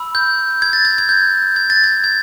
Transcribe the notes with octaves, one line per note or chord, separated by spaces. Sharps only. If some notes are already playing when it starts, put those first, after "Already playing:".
Already playing: B5 E6
G6
G#6
A6
G#6
G#6
G6
G#6
A6
G#6
G#6